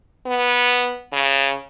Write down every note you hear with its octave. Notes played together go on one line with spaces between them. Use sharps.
B3
C#3